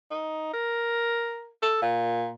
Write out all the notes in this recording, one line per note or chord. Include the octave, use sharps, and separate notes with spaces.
D#4
A#4
A4
A#2